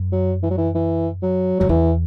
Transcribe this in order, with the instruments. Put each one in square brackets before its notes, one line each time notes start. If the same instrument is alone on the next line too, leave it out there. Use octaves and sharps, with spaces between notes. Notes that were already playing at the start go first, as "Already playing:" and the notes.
Already playing: [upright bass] F#2
[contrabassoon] F#3
E3
F#3
E3
E3
F#3
[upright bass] F#2 [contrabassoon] F#3
[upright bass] E2 [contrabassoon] E3